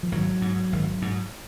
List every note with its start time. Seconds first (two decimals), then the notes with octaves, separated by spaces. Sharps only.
0.03 F3
0.12 G#1 F#3
0.42 G#2
0.72 G#1
1.02 G#2